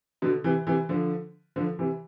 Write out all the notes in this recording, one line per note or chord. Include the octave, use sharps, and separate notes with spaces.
B2 D3
C3 E3
C3 E3
D3 F3
D3 F3
C3 E3